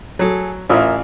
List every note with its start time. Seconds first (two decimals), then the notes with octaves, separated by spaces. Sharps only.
0.19 F#3 G#4 A4
0.69 A1 F4 G#4 A#4 E5 E6